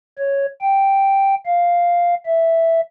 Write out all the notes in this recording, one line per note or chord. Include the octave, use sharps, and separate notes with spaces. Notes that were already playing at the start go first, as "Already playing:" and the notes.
C#5
G5
F5
E5